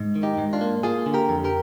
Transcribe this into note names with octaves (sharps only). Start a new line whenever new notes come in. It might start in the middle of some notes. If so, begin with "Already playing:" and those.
Already playing: G#2
D#3
D#4 G4
G#2
D4 F4
A#3
A#3 F4 G#4
D3
G4 A#4
F2
G4 A#4